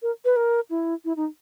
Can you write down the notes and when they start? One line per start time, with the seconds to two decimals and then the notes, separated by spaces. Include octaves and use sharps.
0.02 A#4
0.25 B4
0.36 A#4
0.70 E4
1.05 E4
1.17 D#4